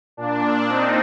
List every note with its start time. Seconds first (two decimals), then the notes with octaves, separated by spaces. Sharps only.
0.17 A#2 D4
0.68 C4 D#4